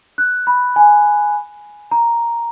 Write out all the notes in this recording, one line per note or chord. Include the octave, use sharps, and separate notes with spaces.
F#6
B5
G#5
A#5